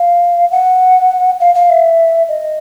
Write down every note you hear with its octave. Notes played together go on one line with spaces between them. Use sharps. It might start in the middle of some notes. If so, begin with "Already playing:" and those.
Already playing: F5
F#5
F5
F5
E5
D#5